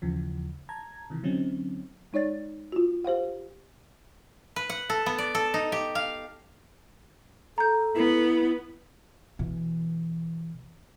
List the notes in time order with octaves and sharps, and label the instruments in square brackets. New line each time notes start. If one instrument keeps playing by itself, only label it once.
[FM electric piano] D#2 C#3 E3 F3
A5 A#5 G#6
C3 D#3 E3
D3 F#3 C4 C#4 D#4
[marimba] G#3 D#4 C#5 D5 A6
F4 F#4
G4 C5 F5 F#5
[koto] B4
F#5
A4
B3
D5
A4
D#4
G4
F5
[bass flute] A4 [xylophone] A#5 G6
[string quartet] B3 [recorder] E4
[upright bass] B2 E3